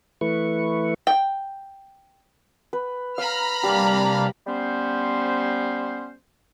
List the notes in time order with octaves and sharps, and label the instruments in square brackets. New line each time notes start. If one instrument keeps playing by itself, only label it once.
[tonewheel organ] E3 A3 E4 B4 C#6
[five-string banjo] G5
[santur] B4
[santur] F5 [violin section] A#5 B5 F6
[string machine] C3 G3 [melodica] A#3 D4 F5 [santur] G4
[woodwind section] G3 B3 C#4 C5